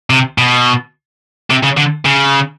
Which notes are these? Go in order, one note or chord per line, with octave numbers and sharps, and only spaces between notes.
C3
B2
C3
C#3
D3
C#3